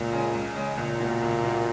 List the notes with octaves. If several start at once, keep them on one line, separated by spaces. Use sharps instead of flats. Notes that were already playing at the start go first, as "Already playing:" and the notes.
Already playing: C#2 A#2
C#3 G#3 C#4
C#2
C#3 G#3 C#4
C#2 A#2
B2 A#3
C#2
B2 A#3